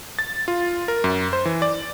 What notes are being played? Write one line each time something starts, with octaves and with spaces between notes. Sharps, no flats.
A6
F4
A#4
F#2
C5
E3
D5